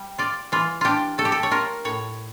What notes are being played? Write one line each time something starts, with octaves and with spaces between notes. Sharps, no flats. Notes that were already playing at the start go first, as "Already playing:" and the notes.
Already playing: G3
F4 D5
E3 F4
D4 F4 G4
A3 A4
G4
A4
C#5
F4 A#4
A2 C#5